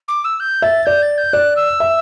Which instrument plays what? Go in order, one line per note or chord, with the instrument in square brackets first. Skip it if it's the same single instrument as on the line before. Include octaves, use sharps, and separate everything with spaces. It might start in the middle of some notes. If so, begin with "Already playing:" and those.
[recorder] D6
E6
G6
[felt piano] E5 [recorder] A6
[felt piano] D5 [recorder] G6
[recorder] A6
G6
[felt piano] D5 [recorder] F#6
[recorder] E6
[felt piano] E5